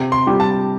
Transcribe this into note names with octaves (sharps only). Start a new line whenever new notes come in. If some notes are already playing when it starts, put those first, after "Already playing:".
Already playing: C3
C6
G3 D4 G4
A5